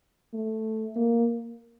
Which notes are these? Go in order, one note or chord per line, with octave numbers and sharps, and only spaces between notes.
A3
A#3